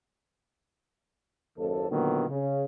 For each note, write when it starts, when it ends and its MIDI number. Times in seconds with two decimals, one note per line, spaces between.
1.58 1.87 30
1.58 1.87 39
1.58 1.87 69
1.90 2.25 46
1.90 2.25 50
1.90 2.25 51
1.90 2.25 54
1.90 2.25 58
1.90 2.25 59
2.28 2.64 49